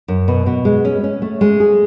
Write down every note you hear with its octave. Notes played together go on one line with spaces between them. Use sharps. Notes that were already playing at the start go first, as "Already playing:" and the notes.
F#2
B2
B2
G#3
C#4
C#4
A3
G#3
G#4